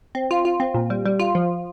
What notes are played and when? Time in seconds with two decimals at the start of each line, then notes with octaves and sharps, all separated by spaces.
0.15 C4
0.31 F4
0.45 F4
0.60 C4
0.74 A#2
0.90 G3
1.06 G3
1.20 F4
1.35 F3